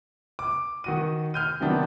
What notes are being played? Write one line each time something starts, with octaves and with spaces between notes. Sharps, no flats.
D6
D#3 F#4 D#7
F6 G6 D#7
C3 D#3 F#3 B3 D4